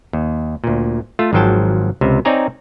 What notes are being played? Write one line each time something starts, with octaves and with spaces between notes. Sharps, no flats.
D#2
D2 A#2
A3 F4
G#1 G#2 F3 F#3 G5 A5
C#2 C3
C4 D#4 C#5 D5 G#5 A#5